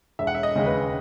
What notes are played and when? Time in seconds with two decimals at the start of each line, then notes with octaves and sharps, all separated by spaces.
0.19 E1 E5
0.27 F#5
0.35 E5
0.43 D#5
0.55 D#2 C#3 G#3
0.66 B4